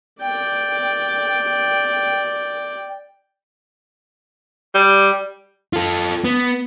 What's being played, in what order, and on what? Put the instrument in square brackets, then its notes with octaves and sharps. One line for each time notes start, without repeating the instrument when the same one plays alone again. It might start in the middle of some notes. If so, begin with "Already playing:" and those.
[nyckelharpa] D5 G5
[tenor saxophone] G3
[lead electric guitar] F4 A4
B3